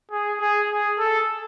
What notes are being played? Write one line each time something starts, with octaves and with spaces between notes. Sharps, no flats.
G#4
G#4
G#4
A4